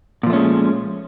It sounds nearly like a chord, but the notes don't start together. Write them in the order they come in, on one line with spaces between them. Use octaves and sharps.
A#2 F3 A3 C#4 G#3